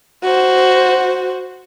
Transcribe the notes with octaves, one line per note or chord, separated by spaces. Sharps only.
F#4 C5